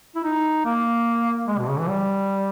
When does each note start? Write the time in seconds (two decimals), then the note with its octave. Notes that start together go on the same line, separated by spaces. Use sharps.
0.15 E4
0.24 D#4
0.65 A#3
1.48 G#3
1.58 B2
1.69 C#3
1.79 E3
1.89 G3